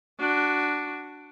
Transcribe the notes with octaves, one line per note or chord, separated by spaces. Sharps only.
D4 F#4